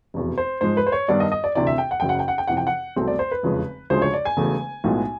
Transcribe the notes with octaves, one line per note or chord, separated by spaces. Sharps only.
F1 E2 B2
C5
G#2 F3 G#3 C5
B4
C5
C#5
G2 D#3 G3 B3 D4 D5
D#5
D#5
D5
D2 C3 E3 D5
E5
G5
F#5
F#1 F#2 C#3 G5
F#5
G5
F#5
G5
F2 C3 E3 F#5
G5
F#5
C2 B2 F#3 A3 C4
D5
C5
B4
F1 E2 C#3 F3 G#3
D2 C#3 F3 G#3 C5
C#5
D5
G#5
E1 E2 C#3 F#3 A3
B1 A2 F3 G#3 B3